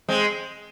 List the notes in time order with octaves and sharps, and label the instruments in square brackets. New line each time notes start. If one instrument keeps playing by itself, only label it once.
[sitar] G#3 C4